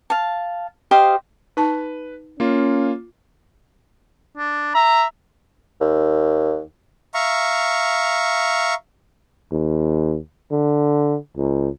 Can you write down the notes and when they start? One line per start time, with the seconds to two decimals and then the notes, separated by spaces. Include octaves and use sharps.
0.10 F5 A5
0.91 G4 C5 D#5 F5
1.57 D#4 B4 A5
2.40 A#3 C#4 F4
4.38 D4
4.75 E5 A#5
5.81 D#2
7.14 E5 F5 A#5 C#6
9.52 D#2
10.51 D3
11.37 C#2